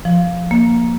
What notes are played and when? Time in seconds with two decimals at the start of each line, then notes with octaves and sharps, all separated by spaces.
0.05 F3
0.51 A#3